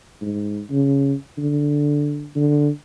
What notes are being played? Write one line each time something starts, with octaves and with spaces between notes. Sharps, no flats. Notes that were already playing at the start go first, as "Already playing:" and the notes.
G#2
C#3
D3
D3